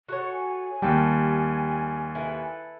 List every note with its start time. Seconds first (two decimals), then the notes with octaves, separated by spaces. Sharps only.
0.08 F#4 A4 C#5
0.32 G#5
0.82 D#2 G3 G4 G5 A5
2.15 E4 A4 B4